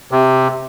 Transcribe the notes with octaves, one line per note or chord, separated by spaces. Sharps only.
C3